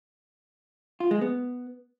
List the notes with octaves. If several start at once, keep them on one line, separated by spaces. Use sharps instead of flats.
F4
G#3
B3